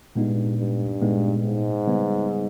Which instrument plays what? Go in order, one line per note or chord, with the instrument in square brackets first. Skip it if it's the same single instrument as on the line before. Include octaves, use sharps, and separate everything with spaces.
[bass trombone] G2 [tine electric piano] A#2 G#3 B3 D#4
[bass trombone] G2
[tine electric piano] A#2 G#3 B3 D#4
[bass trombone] G#2
[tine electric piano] C#3 G3 B3